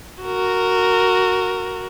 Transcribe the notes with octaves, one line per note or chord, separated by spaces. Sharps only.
F#4 A#4